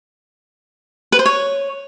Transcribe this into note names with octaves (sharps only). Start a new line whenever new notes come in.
B4
C5
C#5